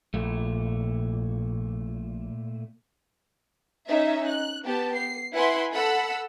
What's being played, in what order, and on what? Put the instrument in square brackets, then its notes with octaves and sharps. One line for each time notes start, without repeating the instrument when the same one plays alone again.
[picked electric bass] A#1 [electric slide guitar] A#2 A3
[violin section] C#4 D#4 E5
F#6
B3 G4 A5
C7
E4 B4 F#5 G#5 B5 C6
A4 F#5 B5 E6